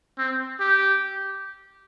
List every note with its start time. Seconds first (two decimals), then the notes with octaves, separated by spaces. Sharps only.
0.18 C4
0.60 G4